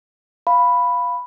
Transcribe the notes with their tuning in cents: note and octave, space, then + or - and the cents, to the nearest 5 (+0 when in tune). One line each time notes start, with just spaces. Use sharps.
F5 +0 B5 +0